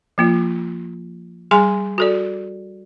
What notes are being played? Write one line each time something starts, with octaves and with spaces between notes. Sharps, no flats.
F3 A#3 F4
G3 G#4 G#5 C6
F#4 A4 D5